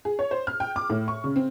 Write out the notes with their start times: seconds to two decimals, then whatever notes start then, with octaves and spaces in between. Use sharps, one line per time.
0.05 G#4
0.19 C#5
0.31 C5
0.47 F6
0.60 G5
0.76 D6
0.90 A2
1.08 C#6
1.24 C#3
1.36 C4